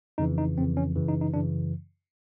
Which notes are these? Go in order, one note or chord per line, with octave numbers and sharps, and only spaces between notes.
F2 C#3 E3 D#4
D#4
F2 C#3 E3 C4
C#4
F#2 C#3 E3
D#4
D#4
F#2 C#3 E3 D4